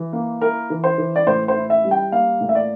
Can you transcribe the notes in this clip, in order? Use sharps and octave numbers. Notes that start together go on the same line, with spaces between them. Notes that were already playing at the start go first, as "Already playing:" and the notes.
Already playing: E3
A#3
E4 A#4
E3
C5
E3
D5
A2 C5
C5
E4
E5
G3
G5
A#3 F5
A2
E5
D5